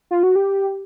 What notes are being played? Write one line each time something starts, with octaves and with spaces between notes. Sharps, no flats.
F4
F#4
G4